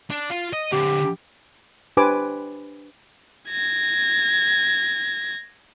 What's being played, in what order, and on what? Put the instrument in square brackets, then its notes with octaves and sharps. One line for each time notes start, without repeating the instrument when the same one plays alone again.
[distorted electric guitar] D4
F4
D#5
[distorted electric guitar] D3 C4 [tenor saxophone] G4
[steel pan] D4 G4 B4 C5 G#5 D6
[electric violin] G#6 A#6